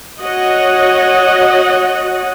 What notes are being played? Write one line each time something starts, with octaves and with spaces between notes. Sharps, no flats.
F#4 C#5 D#5 F#5